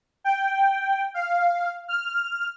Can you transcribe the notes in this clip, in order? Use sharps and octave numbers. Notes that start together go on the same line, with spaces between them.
G5
F5
F6